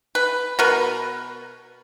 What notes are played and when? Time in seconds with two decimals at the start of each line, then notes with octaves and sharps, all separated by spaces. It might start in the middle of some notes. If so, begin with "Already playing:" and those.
0.15 B4
0.59 B2 A#4 B4